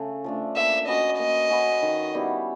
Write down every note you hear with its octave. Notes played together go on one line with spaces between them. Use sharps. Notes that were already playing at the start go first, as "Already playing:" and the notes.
Already playing: C#3 A3
F3 A3 D4
A#3 E5
C#4 F#4 B4 D#5
A#3 D#5
C#4 F#4 B4
D#3
G3 B3 E4